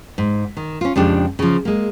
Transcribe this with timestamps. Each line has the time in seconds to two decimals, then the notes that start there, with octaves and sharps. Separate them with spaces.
0.18 G#2
0.57 D#3
0.81 C#4 F4
0.96 F2 C#3 G#3 D4 G4
1.39 C#3 F3
1.65 G#3 A#3